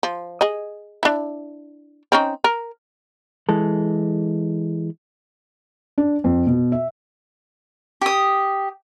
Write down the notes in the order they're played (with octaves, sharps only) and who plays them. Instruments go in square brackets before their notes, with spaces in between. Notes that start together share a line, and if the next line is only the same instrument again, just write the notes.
[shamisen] F3
G#4 D#5
D4 E4
C4 C#4 D#4
A#4
[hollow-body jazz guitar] E3 G#3 A4
[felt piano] D4
F2
B2
E5
[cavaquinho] G4 D#6